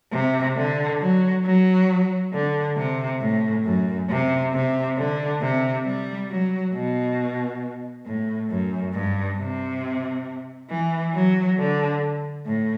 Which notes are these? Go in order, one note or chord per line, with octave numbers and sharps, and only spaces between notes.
C3
D3
F#3
F#3
D3
C3
A2
F#2
C3
C3
D3
C3
G3
F#3
B2
A2
F#2
G2
C3
E3
F#3
D3
A2